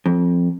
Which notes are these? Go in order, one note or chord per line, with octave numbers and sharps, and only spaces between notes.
F2